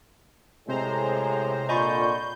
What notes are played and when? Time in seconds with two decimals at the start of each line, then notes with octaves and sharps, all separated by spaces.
0.68 A2 C3 G#3 G#4 C5 A#5
1.69 A#2 D3 F4 D#5 G#5 B5 C#6 G6